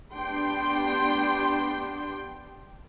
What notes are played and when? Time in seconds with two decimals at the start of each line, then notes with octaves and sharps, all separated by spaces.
0.13 B3 D4 G4 G5 C6